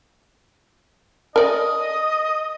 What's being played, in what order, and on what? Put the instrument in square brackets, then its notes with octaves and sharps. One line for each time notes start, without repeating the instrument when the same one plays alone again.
[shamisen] A#4 D5 [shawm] D#5